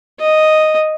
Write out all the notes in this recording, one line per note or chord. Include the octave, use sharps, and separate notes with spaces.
D#5